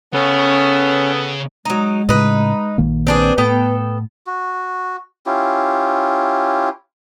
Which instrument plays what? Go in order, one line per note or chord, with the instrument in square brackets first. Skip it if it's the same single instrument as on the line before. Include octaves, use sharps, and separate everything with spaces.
[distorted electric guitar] C#3 [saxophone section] B3 A4 [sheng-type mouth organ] C#4
[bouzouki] F#3 D#4 [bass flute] G#3
[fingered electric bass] A2 C#3 [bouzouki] D#4 B4
[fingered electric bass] A#1 D#3 A#3
[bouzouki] C4 D4 G#4 [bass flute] B4
[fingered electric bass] A2 [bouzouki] B3 A4 G5
[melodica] F#4
C#4 E4 F4 G4